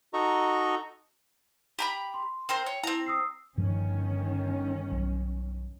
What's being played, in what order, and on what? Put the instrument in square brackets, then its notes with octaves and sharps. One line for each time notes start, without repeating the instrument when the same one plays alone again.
[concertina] D#4 F#4 A4 D#5 A#5 C#6
[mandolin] G4 A#5 B5
[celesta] C6
[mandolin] C4 A#4 C5 [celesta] G5
[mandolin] C#5
[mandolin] C4 A#5 [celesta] E4 F7
[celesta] D#6 E6 C7
[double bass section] G1 D#3 C#4 [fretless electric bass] G2 F3 A3
[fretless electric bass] B1